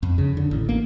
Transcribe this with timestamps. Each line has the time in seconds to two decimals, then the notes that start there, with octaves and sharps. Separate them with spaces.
0.03 F2
0.18 C#3
0.37 D3
0.51 A1
0.69 A#3